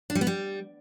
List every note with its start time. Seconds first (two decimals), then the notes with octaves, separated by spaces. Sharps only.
0.10 D4
0.15 G3
0.21 B3
0.27 G3